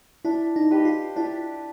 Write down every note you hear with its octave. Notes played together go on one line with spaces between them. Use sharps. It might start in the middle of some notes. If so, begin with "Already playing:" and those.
D4 E4
D#4
G4 B4 D#5
F4
D4 E4